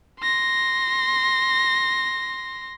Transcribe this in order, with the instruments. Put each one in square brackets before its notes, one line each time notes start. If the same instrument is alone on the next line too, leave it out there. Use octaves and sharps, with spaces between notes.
[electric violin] C6 A#6